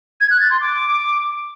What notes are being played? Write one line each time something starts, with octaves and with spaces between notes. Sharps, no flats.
G#6
F#6
A6
C6
D6